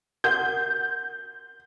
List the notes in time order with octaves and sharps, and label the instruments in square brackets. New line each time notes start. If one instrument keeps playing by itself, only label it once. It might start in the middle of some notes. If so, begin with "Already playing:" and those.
[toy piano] F#4 A#4 F#5 [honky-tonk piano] G6